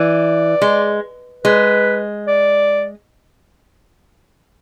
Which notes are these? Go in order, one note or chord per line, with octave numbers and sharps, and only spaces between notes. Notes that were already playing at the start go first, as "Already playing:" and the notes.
Already playing: E3 D5
G#3
G#3 B4
D5